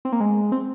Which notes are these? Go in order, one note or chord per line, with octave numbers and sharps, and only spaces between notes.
C4
A#3
G#3
C4